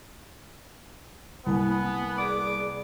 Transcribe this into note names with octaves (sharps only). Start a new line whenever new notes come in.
C2 A#3 B3 G#5
G#4 D5 D6